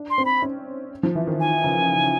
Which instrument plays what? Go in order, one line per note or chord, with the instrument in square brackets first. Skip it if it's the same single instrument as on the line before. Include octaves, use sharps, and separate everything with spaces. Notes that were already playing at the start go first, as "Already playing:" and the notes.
Already playing: [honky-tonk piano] D4
[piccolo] C6
[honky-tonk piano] C4
[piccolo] B5
[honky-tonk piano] C#4
F3
E3
D#3
[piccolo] G#5
[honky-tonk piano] C#3